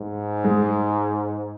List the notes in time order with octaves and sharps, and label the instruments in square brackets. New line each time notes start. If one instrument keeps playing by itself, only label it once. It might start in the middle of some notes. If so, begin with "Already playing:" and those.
Already playing: [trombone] G#2
[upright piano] G#3